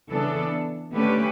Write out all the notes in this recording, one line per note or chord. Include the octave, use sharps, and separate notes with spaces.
C#3 E3 B3 D4 A4
D3 A3 C#4 G4 B4